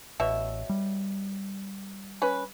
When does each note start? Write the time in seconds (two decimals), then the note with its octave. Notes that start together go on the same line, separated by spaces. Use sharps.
0.20 A1 B2 C#5 E5
0.69 G3
2.22 C#4 B4